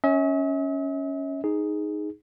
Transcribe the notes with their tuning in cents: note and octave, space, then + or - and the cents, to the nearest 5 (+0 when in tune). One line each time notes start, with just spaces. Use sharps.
C#4 +0 E5 -45
D#4 +0 G#4 +0